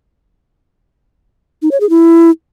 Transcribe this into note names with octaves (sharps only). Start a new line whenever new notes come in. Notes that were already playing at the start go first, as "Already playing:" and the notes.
D#4
C#5
G#4
E4